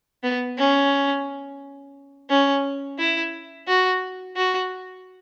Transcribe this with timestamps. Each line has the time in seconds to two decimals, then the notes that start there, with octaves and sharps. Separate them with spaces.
0.23 B3
0.58 C#4
2.29 C#4
2.99 E4
3.68 F#4
4.36 F#4